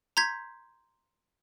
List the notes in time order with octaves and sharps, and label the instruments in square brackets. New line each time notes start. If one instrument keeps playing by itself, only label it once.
[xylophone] A#5 C6 G6 G#6 B6